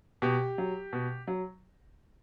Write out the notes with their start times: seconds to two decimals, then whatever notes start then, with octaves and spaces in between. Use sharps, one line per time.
0.22 B2 G4
0.58 F#3
0.93 B2
1.27 F#3